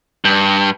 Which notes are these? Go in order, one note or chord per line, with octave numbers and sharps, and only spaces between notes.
G2